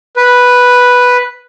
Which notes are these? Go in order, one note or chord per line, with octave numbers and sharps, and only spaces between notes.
B4